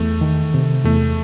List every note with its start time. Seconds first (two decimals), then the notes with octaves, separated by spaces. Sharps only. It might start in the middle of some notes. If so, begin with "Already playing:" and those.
Already playing: E2 A3
0.21 D#3
0.54 C3
0.85 E2 A3